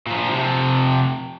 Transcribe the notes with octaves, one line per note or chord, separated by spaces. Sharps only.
A#2 F3
C3 F3